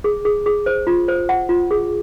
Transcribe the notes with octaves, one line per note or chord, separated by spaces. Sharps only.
G#4
G#4
G#4
C5
F4
C5
F#5
F4
G#4